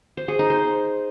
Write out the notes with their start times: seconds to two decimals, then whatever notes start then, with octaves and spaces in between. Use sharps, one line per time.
0.17 C5
0.28 G#4
0.39 D#4
0.50 C5